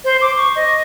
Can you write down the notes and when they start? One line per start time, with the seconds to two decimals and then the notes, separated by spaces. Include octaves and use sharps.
0.05 C5
0.21 D6
0.37 C#6
0.56 D#5